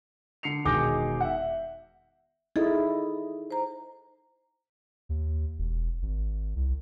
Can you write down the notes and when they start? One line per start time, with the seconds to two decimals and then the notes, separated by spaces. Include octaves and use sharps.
0.43 D3 C7 C#7 F7
0.65 E1 D#3 G#4 D6 G6 A#6
1.21 E5 F#5
2.56 D#4 E4 G#4 A4 D#5
3.51 C5 A#5
5.09 D#2
5.59 E1
6.02 G#1
6.56 C2